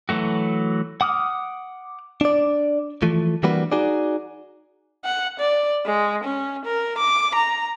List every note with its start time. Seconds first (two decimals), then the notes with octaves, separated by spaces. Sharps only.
0.09 E3 F#3 A3 F#4
1.01 F#5 D6 D#6 F6
2.21 D4 D5
3.02 E3 F3 A3
3.43 E3 G3 A#3 D4 F#4 B4
3.72 D#4 F#4 G#4 D5
5.05 F#5
5.39 D5
5.85 G#3
6.24 C#4
6.65 A#4
6.98 D6
7.35 A#5